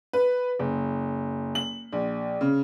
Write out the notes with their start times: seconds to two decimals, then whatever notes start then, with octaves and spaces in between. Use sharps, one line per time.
0.13 B4
0.59 F#1
1.55 F#7
1.92 A#1
2.41 C#3